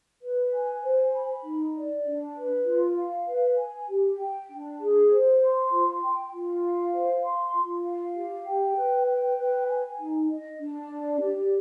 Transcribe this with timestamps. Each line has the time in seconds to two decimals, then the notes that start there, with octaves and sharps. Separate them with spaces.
0.22 B4
0.53 G#5
0.83 C5
1.14 B5
1.44 D#4
1.75 D5
2.06 D4
2.36 B4
2.66 F4
2.96 F5
3.28 B4
3.58 G#5
3.89 G4
4.19 G5
4.50 D4
4.79 G#4
5.10 C5
5.41 C6
5.71 F4
6.01 G5
6.32 F4
6.63 F5
6.93 C5
7.23 C6
7.54 F4
7.84 F5
8.16 G4
8.46 G5
8.76 B4
9.07 G5
9.38 B4
9.68 G#5
9.98 D#4
10.29 D#5
10.59 D4
10.90 D5
11.19 G4